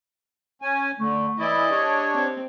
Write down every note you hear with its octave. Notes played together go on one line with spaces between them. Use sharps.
C#4 G#5
D3 A3
E3 E4 D5 D#5
D4 G4 C#5
C4